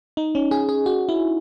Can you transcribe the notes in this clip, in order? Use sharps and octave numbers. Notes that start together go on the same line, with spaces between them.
D#4
C#4
G#4
G#4
F#4
E4